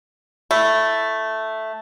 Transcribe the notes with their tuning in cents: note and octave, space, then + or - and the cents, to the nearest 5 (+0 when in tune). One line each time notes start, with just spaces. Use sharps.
A3 +0 E4 +0